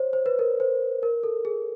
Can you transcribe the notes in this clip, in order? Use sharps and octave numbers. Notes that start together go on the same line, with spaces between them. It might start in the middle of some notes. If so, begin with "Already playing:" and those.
Already playing: C5 C#5
C5
B4
A#4
C5
A#4
A4
G#4